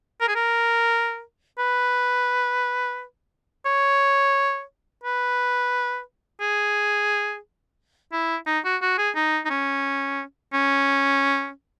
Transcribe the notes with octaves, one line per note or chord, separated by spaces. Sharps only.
A#4
G#4
A#4
B4
C#5
B4
G#4
E4
D#4
F#4
F#4
G#4
D#4
D#4
C#4
C#4